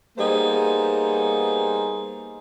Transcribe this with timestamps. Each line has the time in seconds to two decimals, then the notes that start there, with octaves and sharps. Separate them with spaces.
0.18 G3 A#3 B3 D#4 G#4 C5